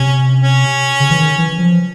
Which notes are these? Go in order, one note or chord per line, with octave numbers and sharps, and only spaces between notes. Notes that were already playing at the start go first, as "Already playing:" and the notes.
Already playing: C3 C#4
C#4
C#3
E3
D#3
E3
F3